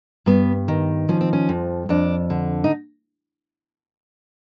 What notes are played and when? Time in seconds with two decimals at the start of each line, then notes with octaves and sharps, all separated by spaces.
0.26 G2 B3
0.68 D#3
1.09 F3 C#4
1.21 C4
1.33 C#4
1.49 F2
1.89 F2 D4
2.30 D3
2.64 D#4